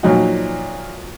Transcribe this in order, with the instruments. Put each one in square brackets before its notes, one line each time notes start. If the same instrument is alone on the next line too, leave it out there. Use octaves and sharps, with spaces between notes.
[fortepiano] A#2 F3 F#3 D#4 F#4